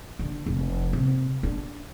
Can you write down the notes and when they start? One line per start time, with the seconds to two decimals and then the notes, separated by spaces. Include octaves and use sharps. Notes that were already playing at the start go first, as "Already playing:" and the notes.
0.19 D3
0.46 F1
0.93 C3
1.43 D4